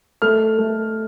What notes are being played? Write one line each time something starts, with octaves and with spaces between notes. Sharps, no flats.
A3 F6
A3